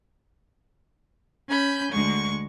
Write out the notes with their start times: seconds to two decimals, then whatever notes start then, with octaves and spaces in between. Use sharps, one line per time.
1.48 C#4 G#5 B5 G6
1.90 D2 G#3 C#6